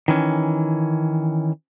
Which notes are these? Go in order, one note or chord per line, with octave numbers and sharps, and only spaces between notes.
D#3 E3 C#4